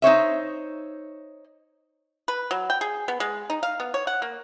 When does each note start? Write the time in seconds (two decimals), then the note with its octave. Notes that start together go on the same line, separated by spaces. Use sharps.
0.02 D#4 C5 C#5 E5
2.28 B4
2.51 F#3
2.70 G5
2.81 G#4
3.08 B3
3.20 G#3
3.50 D#4
3.63 F5
3.80 B3
3.94 C#5
4.07 F#5
4.22 A#3